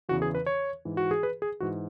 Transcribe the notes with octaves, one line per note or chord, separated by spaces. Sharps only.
E2 C#3 E3 F#4
G#4
B4
C#5
G#2 E3
F#4
G#4
B4
G#4
G#2 E3 F#4